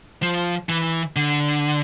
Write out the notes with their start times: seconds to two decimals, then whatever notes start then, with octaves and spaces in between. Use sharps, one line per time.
0.22 F3
0.69 E3
1.16 D3